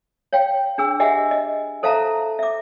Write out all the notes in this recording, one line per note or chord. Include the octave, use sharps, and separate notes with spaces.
C#5 F5 G5
D4 G#4 E6
G4 G#4 D#5 E5 F#5 G#5
D#5
A4 C5 E5 F5 A5 A#5
E5 D6